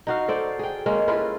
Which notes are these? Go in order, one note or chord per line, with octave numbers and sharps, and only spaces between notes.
D#4 F#4 F5
A4 C5 D5
G#4 G5
G#3 A#3 C#4
E4 F4 A4 B4